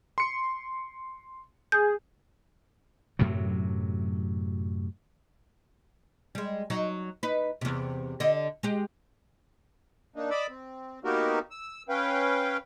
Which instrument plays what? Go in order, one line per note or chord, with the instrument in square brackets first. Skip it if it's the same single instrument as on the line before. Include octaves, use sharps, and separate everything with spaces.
[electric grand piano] C6 C#7
[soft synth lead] G#4 [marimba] G6
[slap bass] F#2 A2 C3 F#3
[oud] G3 G#3
F#3 D#4
D#4 B4
E2 C3
D3 D#5
G#3 G4
[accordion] A#3 D4 D#4
D5 D#5 B5 D6 E6
C4
A#3 B3 D#4 F#4 G4 A#4
E6
C#4 B4 F5 G5